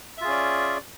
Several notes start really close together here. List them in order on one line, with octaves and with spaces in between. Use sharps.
E5 F4 G#4 C#4 D5